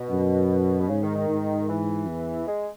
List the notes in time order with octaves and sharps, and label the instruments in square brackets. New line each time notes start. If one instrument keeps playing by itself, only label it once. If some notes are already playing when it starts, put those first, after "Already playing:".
Already playing: [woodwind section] B2
[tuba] F#2
[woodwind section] B2
[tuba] G#2 [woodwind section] C#3
[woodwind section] D#3
D#3
[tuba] G#2
[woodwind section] E3
[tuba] E2
[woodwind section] G#3